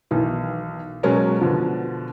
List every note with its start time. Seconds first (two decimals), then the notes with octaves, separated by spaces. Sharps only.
0.11 B1 D#3 E3
1.03 B2 F#3 G#3 C#4 A#4
1.40 B2 D3 F3